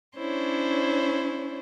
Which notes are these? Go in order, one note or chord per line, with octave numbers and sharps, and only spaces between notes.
C#4 D4 E4 C5 C#5